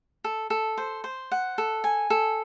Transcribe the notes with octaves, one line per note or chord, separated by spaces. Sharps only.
A4
A4
C5
C5
F#5
A4
G#5
A4